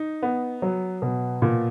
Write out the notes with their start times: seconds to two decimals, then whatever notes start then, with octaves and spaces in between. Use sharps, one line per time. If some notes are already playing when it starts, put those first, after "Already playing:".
Already playing: D#4
0.22 B3
0.62 F#3
1.02 B2
1.42 A#2